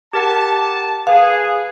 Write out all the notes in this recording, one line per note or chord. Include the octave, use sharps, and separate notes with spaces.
G4 A#4 F#5 A5
A5
G#4 B4 F5